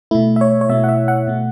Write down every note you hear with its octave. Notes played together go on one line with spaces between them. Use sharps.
B2 A3 E4
E5
C#5
C#5
B2 A3 E5
F#5
E5
F#5
B2 A3